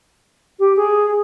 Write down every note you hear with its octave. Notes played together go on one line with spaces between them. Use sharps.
G4
G#4